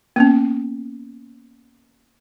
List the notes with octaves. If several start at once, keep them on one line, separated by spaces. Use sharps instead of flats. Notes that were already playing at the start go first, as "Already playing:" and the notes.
A#3 B3 C#4